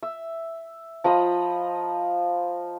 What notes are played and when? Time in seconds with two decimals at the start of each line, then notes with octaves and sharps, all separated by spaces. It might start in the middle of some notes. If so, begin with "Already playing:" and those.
0.03 E5
1.04 F3 D#5 A#5 B5